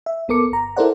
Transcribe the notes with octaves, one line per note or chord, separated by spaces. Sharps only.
E5
G#1 B3 A4 A#4 D6 C#7
G1 A#5
E4 A4 A#4 C5 D5 F#5